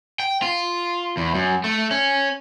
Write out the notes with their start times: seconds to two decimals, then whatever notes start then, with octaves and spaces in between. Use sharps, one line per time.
0.20 G5
0.42 F4
1.17 E2
1.35 F#2
1.64 A3
1.91 C#4